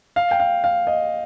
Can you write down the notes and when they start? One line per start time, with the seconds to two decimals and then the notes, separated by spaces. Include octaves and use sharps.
0.16 F5
0.31 G5
0.40 F5
0.64 F5
0.87 D#5